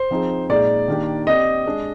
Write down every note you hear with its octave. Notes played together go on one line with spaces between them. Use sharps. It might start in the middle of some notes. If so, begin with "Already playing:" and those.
Already playing: C5
F3 C4 D#4 G#4
A#2 G#3 D#4 G#4 D5
D#3 A#3 D4 G4
C4 G4 D5 D#5
G#3 D4 G#4